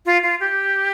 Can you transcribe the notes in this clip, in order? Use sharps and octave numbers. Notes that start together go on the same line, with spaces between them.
F4
F4
G4